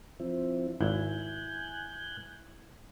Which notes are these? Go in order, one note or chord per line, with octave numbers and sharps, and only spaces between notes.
F3 C4 E4
G#1 E4 G#5 F#6 G6